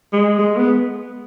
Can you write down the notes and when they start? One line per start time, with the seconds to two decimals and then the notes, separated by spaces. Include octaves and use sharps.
0.13 G#3
0.39 G#3
0.57 B3